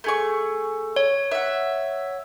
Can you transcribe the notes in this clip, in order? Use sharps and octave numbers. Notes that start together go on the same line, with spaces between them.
A3 G#4 C#6
C#5
E5 F#5